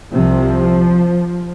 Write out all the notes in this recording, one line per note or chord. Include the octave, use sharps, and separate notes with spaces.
C2 C3 F3